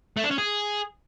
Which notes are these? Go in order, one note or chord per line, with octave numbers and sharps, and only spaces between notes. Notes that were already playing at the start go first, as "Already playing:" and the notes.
A3
D4
C#4
G#4